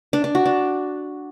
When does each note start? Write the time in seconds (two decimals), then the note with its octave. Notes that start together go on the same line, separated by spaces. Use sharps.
0.13 D4
0.24 D4
0.35 F#4
0.46 D4